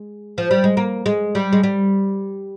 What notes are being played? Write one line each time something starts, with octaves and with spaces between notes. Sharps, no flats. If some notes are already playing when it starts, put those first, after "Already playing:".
Already playing: G#3
F3
G3
G#3
A#3
G#3
G3
G#3
G3